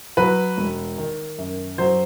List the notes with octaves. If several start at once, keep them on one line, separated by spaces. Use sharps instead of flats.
F#3 B4
E1
D#3
F#2
F#3 C5